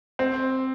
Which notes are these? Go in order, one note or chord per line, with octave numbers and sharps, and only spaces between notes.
C4